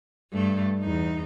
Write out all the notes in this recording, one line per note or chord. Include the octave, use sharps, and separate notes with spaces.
G2 A3
E2 D#4